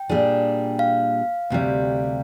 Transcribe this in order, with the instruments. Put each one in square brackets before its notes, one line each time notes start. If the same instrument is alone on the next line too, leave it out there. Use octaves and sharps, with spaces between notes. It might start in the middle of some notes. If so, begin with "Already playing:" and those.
Already playing: [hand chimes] G5
[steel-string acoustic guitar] A#2 G3 D4 G#4
[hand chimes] F5
[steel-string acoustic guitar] D2 C3 G3